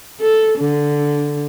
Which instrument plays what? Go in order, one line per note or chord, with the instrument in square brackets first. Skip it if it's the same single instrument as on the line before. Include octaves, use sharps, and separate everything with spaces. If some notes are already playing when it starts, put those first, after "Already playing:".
[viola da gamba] A4
D3